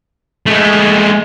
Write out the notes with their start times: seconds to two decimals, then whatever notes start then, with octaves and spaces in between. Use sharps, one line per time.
0.46 G#3 A3